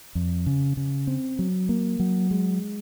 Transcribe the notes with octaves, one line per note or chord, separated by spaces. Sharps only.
F2
C#3
C#3
C4
F#3
A#3
F#3
G#3